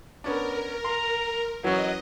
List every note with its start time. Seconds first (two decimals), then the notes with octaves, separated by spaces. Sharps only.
0.24 B3 C#4 D4 A#4
0.84 A#5 C6
1.64 E3 F#3 C#4 D#5